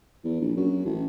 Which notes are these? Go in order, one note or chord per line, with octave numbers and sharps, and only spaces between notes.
E2
A#1
F#2
A1